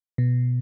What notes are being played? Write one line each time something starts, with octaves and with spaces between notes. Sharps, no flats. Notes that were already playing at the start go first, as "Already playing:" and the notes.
B2